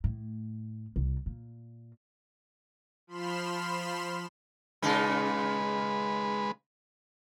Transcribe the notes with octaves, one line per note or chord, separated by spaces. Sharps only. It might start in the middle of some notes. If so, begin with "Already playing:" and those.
A2
C2
A#2
F3 B5 C6 F6 E7
A#2 C#3 G#3 D#4 B4